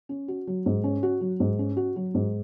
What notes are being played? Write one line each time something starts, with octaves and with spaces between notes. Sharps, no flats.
C#4
F#4
F#3
G#2
C#4
F#4
F#3
G#2
C#4
F#4
F#3
G#2